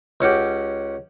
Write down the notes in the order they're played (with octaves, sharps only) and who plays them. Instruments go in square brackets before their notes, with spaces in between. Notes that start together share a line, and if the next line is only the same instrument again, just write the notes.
[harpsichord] C#2 C#4 F#4 G4